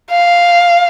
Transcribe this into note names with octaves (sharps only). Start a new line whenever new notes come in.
F5